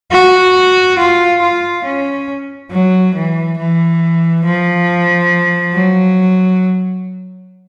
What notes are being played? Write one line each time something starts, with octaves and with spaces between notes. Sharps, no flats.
F#4
F4
F4
C#4
F#3
E3
E3
F3
F#3